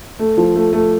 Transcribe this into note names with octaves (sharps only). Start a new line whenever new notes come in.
A3
F3
A3
A3